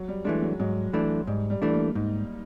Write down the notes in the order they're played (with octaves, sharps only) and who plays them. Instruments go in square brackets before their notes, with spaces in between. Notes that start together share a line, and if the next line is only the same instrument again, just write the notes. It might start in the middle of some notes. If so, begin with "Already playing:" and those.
Already playing: [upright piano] F#3
G3
[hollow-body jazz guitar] E3 A3 D4 [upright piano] G#3
[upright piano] F#3
[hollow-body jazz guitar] G#2 [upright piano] F#3
[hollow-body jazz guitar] E3 A3 D4
[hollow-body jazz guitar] G#2 [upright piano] G3
[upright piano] G3
[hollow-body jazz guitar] E3 A3 D4
[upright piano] A#3
[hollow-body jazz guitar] G#2 [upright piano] D#4